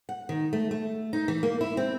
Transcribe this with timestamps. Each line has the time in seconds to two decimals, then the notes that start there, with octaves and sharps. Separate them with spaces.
0.09 F#5
0.29 D#3
0.53 A3
0.71 A3
1.13 D#4
1.28 E3
1.43 A#3
1.61 E4
1.77 C4